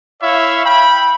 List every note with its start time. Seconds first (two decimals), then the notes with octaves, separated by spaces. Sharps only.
0.21 E4 C#5 E5 F5
0.65 G5 B5